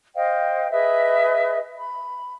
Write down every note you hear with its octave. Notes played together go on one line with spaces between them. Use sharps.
C5 D#5 F5 G5
G#4 B4 D#5 E5
B5